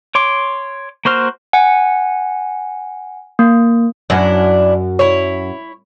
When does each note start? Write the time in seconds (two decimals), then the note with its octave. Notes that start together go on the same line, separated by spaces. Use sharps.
0.15 C#5 C6 D6
1.05 A#3 F#4 C5 F6
1.53 F#5 G#5
3.39 A#3
4.10 F#2 D4 E4
4.99 E4 C#5